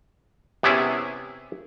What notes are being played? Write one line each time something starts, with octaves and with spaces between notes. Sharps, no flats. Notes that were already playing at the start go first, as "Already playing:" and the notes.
C3 B3 C#4 E4 G#4